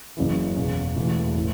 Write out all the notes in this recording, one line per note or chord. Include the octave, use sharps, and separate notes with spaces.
F#1 F#2 C#3 E3
E1 E2 C#3
E1 E2 E3 A3 E4
A2 A3